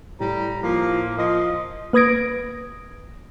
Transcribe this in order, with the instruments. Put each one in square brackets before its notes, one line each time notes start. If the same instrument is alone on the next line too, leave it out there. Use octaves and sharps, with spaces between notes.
[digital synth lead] A2 [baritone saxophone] G3 [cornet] A#5
[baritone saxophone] F3 [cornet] A#3
[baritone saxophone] F3 [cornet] D#5
[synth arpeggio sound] A#3 B4 D#6 G#6 A#6 D7